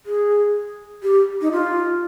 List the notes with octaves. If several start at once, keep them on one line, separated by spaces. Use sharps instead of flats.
G#4
G4
D#4
F4